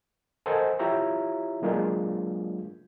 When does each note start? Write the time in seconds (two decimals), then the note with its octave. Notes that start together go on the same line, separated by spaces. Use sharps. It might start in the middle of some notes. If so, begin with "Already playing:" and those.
0.46 A4 A#4 C5 D#5 F#5 G#5
0.79 E4 F4 G4 C#5 E5 A#5
1.62 F#3 G#3 A#3 D4 F4 G#4